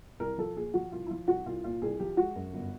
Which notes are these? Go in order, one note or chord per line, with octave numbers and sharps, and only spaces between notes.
C2 A#4
F3 A4
A#2 G#4
F3 F#4
C2 F4
E4
F3 F4
C2 F#4
C2 F4
A#2 F4
C2 G#4
F3 G4
G#3 F#4
F#2
G1